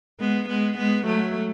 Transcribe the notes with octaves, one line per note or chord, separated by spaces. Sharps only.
G#3 B3
G#3 B3
G#3 B3
F#3 A3